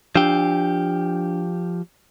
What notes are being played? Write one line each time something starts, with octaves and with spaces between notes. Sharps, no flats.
F3 D4 G4